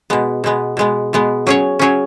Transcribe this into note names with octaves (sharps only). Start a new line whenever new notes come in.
B2 G#3 B3
B2 G#3 B3
B2 G#3 B3
B2 G#3 B3
F#3 C#4 G#4 C#5
F#3 C#4 G#4 C#5